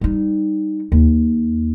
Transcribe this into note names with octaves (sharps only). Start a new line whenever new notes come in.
G3 D#4
D#2